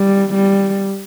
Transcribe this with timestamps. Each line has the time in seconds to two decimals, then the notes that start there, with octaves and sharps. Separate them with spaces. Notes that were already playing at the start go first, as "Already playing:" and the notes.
Already playing: G3
0.33 G3